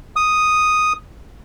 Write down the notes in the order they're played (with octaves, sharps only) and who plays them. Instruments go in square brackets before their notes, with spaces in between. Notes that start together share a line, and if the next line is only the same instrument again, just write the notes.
[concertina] D#6